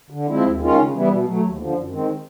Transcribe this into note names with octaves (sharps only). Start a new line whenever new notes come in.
D3
F3 G#3 C4 E4
D#2
D#3 G#3 C#4 F4
C#3
E3 G3 B3 E4
B2
F#3 A3
D#2
D3 F3
F#2
D#3 G#3 C4